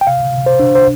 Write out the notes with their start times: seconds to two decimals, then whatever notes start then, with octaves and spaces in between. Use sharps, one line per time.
0.01 G5
0.07 C3 F5
0.33 C3
0.46 C5
0.60 D4
0.75 C5